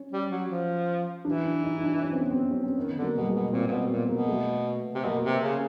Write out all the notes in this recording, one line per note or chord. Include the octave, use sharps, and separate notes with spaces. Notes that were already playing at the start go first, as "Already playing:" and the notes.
Already playing: C#4
G3
F#3
F3
E3 D4
D4
D#4
D#4
D4
C#4
C4
B3
C4
C#4
C4
D#3 B3
D3
A#3
B2 G3
G#3
B2
A#2 C4
A#2
B2 B3
A#2 B3
B2 A#3
A3
C3
B2 A#3
C3
C#3